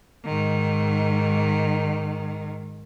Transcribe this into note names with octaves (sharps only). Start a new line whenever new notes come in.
G#2 D#3